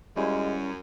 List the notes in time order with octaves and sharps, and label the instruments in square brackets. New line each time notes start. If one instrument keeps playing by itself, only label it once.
[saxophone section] F#2 [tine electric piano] G3 C#4 E4 [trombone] G#3